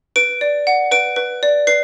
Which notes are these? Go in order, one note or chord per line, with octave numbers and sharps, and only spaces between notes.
B4 D7
D5
F#5
B4 D7
B4
D5
B4 C7